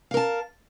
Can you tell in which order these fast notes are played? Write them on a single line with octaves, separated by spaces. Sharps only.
F5 A#4 A5